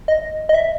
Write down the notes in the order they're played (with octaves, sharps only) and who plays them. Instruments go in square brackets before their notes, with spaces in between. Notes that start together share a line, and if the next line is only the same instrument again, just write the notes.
[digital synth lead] D#5
D#5
E5